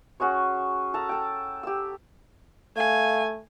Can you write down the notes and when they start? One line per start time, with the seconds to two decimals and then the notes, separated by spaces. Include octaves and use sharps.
0.20 C#4 F#4 G#4 C#5
0.94 A4 A5 A#5
1.09 A4 G5
1.63 G4 E6
2.76 A3 F5 G#5